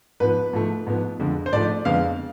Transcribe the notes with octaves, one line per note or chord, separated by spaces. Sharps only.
G#2 F3 B3 B4
G#2 F3 A3
G#2 F3 B3
F2 D3 G#3
C5
G#2 F3 A3 D5
F2 D3 G#3 B3 F5